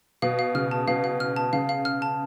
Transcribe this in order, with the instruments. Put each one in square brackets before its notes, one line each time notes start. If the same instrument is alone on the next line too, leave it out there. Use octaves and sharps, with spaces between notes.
[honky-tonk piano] B2 [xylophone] F5
[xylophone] F5
[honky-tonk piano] C#3 [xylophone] F6
[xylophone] A5
[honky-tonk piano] B2 [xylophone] F5
[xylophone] F5
F6
A5
[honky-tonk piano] C#3 [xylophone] F5
[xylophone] F5
F6
A5